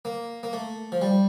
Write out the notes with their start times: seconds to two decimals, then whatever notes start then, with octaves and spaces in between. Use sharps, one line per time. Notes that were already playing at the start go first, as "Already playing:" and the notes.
0.05 A#3
0.43 A#3
0.53 A3
0.92 F3
1.02 G3